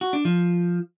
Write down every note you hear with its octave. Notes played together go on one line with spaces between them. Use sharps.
F#4
D4
F3